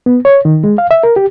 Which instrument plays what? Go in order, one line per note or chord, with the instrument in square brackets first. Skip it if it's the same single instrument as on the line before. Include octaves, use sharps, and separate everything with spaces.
[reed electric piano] B3
C#5
D#3
G#3
F5
E5
A#4
G4